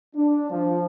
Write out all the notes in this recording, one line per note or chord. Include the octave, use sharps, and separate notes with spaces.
D4
F3